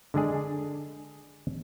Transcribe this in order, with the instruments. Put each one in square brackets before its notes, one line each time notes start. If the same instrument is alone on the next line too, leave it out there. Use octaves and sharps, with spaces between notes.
[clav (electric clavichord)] D3 G#3 D4 G#4